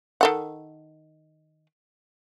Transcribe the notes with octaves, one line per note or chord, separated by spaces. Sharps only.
D#3 A4 F#5